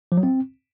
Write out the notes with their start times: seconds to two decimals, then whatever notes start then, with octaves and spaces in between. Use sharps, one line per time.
0.12 F3
0.17 F#3
0.23 C4